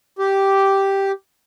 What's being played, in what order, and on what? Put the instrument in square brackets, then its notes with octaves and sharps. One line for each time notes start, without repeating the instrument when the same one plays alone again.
[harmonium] G4